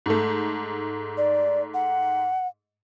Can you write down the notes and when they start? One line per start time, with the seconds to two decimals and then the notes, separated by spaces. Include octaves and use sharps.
0.06 G#2 A3
1.17 D5
1.74 F#5